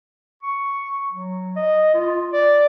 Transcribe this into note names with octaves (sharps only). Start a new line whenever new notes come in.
C#6
F#3
D#5
F4
D5